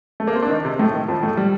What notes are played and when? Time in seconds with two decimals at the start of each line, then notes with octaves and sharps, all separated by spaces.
0.20 A3
0.27 A#3
0.35 C4
0.42 D4
0.50 D#3 D#4
0.64 C3 C4
0.79 A2 A3
0.94 D#3
1.08 F2 F3
1.23 A2 A3
1.37 G3